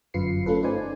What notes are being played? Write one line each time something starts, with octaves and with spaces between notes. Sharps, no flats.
G1 F#2 F4 B4 C7 C#7
A3 C#4 F4 A4 B4
D#4 B4 C5 D5 G#5